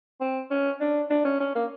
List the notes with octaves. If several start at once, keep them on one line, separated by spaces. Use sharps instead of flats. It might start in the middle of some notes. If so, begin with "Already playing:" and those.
C4
C#4
D4
D4
C#4
C#4
A#3